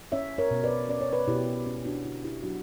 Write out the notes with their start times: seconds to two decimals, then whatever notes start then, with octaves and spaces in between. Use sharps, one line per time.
0.12 C#4 C#5 E5
0.38 A#4 C#5
0.51 B2
0.64 B4 D5
0.89 C#4 D5
1.01 C#5
1.12 B4 D5
1.27 B2 E4 G4
1.66 C#4
1.85 D4 F#4
2.04 D3 E4
2.24 E4 G4
2.43 F#3 D4 F#4